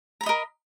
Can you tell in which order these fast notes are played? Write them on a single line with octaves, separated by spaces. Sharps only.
A#5 B5 D#5 A#4